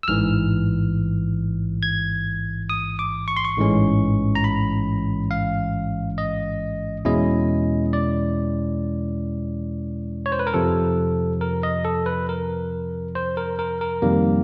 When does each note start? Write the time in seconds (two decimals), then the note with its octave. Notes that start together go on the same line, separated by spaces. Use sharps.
0.03 E6
0.08 A1 G#2 E3 F6
1.83 G#6
2.70 D#6
2.99 D6
3.28 C#6
3.37 C6
3.45 C#6
3.57 A1 G#2 E3 G#3 C#4
4.35 A#5
4.44 B5
5.31 F5
6.18 D#5
7.05 E2 B2 G#3 C#4 E4 D#5
7.93 D5
10.26 C#5
10.32 C5
10.39 B4
10.47 A#4
10.54 F2 C3 F3 A4
11.41 A#4
11.63 D#5
11.85 A4
12.06 B4
12.29 A#4
13.15 C5
13.37 A#4
13.59 A#4
13.81 A#4
14.02 F2 C3 D#3 G3 A#3